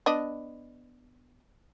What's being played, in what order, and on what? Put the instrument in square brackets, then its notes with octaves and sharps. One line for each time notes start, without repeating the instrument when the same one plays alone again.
[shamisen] B3 D4 D#5